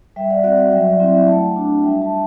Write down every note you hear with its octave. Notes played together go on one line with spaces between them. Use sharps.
G3 E5 G5
D5 F#5
C4 F#4 D5 F#5
D5 F#5
F#3 E5 G5
D5 F#5
C4 E4
E5 G5
A3 F#5 A5
D4 F#4
G3 E5 G5
F#5 A5
F#4